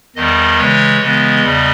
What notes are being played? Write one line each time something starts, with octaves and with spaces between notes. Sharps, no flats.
E2 D#3 G3 D#5
C#3 E3 G#3 C#5
C#3 E3 G#3 B3 D#5
E2 C#3 G3